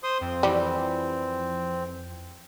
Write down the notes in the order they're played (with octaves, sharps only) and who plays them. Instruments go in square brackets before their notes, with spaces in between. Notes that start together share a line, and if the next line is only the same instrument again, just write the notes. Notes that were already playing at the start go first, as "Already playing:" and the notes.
[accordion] C5 C6 D#6
[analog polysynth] F2 [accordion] C4
[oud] E3 F#4 D5 [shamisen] G3